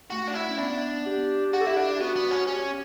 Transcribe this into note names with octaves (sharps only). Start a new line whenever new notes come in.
A3 F#4
D4
E4
C#4
B3 D4
G4
F#4 G4
A4
E4 G4
D4
B3 F#4
B3
C#4
C#4 G4